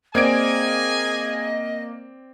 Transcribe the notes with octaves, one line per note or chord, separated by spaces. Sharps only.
A#3 C4 G#4 D5 D#5 G#5 G#6 D7